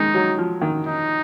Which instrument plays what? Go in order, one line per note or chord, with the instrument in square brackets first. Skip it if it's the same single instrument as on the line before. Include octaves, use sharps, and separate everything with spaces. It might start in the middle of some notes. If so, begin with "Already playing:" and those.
Already playing: [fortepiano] D#3 G#3 [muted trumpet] D#4
[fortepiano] F#3
F3
D#3
[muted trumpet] D#4